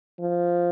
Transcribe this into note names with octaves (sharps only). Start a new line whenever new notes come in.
F3